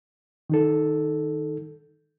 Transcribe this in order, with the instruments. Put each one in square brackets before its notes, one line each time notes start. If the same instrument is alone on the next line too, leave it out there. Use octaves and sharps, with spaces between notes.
[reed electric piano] D#3 D#4 A4